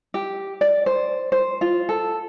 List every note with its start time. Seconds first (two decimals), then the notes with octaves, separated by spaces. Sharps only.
0.14 G4
0.61 D5
0.86 C5
1.32 C5
1.61 F4
1.89 A4